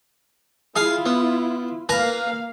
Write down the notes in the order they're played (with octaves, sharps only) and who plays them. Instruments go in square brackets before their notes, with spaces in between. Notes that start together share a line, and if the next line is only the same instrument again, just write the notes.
[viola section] E4 F4 [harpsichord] G#4 F5 G#5
[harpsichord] B3
[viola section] A#3 F5 [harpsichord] B4 G#5 A#5